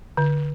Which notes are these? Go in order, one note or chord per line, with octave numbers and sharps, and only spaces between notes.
D3